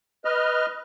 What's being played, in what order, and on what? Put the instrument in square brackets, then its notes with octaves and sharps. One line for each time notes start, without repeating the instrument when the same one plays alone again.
[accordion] B4 D#5 F6